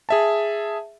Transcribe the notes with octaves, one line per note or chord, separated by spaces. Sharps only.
G#4 E5 A5